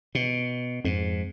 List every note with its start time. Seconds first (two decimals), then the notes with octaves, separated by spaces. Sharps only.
0.15 B2
0.85 F2 G#2